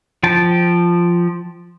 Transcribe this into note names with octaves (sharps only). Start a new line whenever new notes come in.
F3 G5 A5